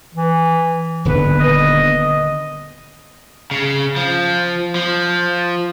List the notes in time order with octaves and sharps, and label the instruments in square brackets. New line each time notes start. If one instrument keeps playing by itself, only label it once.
[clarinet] E3
[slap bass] D#1 D3 B3 [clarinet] B4
[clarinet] D#5
[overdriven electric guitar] C#3
F3
F3